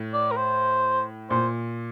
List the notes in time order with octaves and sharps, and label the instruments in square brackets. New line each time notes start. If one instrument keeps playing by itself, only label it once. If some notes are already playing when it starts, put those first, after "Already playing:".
Already playing: [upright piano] A2
[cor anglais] D5
A#4
C5
[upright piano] A#2 [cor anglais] C5